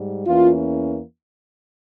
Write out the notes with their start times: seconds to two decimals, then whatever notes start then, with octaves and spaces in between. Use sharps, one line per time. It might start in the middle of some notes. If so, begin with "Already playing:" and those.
Already playing: G#2 G3
0.27 E2 E3 A#3 C#4 F4